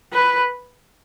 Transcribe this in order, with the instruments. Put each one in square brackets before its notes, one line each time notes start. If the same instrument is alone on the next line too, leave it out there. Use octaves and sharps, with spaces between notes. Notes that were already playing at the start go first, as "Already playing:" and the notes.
[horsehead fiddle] B4